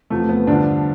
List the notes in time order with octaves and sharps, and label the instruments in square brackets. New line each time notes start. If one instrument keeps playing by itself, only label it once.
[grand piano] E2 C3 F3 A3
B3
G2 D3 F3 D4